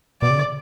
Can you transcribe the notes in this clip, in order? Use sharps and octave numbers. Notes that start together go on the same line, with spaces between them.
B2 D5
C#3
D3